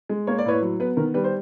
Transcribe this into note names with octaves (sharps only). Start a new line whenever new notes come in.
G#3
A#3 C#5
D5
A2 B4 C#5
F#3
B3 B4
D#3 A#4
G3 B4
C5